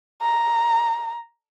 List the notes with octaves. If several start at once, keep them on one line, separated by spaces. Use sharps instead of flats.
A#5